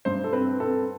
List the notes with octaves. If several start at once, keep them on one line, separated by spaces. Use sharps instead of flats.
G2 C5
A4
C4 B4
C4 A4